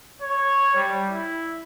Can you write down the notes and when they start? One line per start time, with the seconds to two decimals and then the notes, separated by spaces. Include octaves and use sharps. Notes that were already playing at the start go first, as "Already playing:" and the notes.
0.22 C#5
0.75 G3
1.10 E4